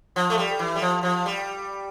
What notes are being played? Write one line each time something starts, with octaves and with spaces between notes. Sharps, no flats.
F3
A3
G3
E3
G3
F3
F3
G3